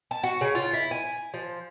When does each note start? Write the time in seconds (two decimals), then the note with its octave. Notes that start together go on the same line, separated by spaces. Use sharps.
0.11 A5
0.23 F#4
0.41 C#3
0.55 F4
0.73 E4
0.91 G#5
1.34 F3